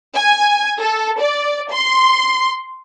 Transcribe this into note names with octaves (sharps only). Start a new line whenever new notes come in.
G#5
A4
D5
C6